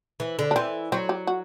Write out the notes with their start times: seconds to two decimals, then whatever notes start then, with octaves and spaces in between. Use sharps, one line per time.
0.20 E3
0.39 D3
0.51 D4
0.56 E3 C4
0.92 F#3 C4
1.09 G4
1.27 F#4